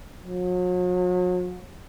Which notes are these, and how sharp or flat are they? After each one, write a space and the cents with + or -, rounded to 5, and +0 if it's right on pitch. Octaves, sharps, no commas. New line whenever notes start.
F#3 -40